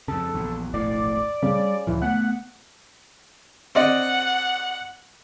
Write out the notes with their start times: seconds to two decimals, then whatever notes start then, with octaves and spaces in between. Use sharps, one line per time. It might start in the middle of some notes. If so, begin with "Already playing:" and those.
0.08 F2 C#3 A4
0.34 A#1 E2
0.74 E1 A#1 A2 D5
1.43 C#3 G3
1.87 D2 A#2 E3 F3
2.02 A3 B3 F#5
3.75 C4 D5 D#5 F#5